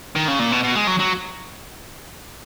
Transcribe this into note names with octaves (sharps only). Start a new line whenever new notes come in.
D#3
C#3
A#2
B2
B2
G#3
F#3
F#3